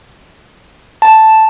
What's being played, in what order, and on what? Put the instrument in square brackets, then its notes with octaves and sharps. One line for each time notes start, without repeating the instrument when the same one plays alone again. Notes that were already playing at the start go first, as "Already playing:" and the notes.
[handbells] A5